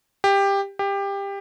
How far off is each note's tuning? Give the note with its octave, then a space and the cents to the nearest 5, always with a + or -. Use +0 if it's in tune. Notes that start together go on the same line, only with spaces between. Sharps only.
G4 +15
G4 +20